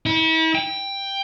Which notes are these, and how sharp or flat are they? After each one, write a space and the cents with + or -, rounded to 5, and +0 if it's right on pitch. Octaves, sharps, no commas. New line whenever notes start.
E4 -40
G5 +10